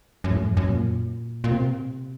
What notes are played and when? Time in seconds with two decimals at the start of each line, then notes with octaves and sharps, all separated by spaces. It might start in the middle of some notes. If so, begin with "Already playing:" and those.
0.24 F#2
0.30 A2
0.44 F2
0.57 F#2
0.70 A#2
1.44 A#2
1.51 C3